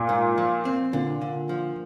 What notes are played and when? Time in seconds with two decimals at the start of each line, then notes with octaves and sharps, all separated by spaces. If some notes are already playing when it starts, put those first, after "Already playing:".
Already playing: A#2
0.09 G#2
0.38 F3
0.65 C4
0.93 A#2 D3
1.21 D3
1.49 F3